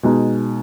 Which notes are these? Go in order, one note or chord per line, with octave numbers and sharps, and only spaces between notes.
B2 G#3 D#4